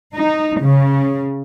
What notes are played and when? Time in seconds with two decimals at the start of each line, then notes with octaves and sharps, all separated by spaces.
0.14 D#4
0.61 C#3